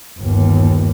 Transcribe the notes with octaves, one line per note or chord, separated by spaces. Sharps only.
G1 D#2